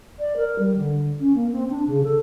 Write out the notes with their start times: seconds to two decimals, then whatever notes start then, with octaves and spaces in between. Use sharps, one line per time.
0.19 D5
0.37 A#4
0.59 G3
0.76 D3
1.20 C#4
1.35 A#3
1.52 C4
1.71 D4
1.87 C#3
2.04 A4